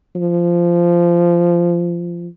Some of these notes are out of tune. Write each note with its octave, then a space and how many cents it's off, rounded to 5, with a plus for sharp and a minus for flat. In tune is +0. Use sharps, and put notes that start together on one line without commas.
F3 -15